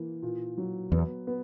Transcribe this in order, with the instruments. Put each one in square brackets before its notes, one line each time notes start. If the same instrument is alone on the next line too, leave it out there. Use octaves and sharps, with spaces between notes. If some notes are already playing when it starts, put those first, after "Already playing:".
Already playing: [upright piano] E3 A#3
A#2
F#3
[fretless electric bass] E2 [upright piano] B3
[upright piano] B3